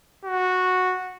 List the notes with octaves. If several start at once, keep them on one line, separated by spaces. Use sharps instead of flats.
F#4